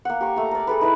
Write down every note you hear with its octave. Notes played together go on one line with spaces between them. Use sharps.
A#3 F#5
G4 A#4 C#6
A3 A#5
A#4 D5
G#4 A4 B4
D#4 E4 B4